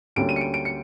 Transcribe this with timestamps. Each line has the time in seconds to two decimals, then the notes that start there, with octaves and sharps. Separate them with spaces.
0.16 D2 D3 G3 A#3 C#4 D7
0.29 D#7
0.36 C#7
0.41 D7
0.54 D7
0.65 C#7